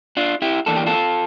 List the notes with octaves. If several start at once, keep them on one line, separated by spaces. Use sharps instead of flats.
D4 F4
E4 G4
E2 E3 A#3 D4 A4
G4
F4 A4